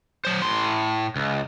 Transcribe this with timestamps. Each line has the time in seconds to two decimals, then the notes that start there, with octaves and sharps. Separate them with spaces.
0.25 F#3 C5
0.42 A2 C6
1.16 C#2